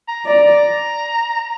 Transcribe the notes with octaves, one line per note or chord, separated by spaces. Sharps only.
A#5
D5 A#5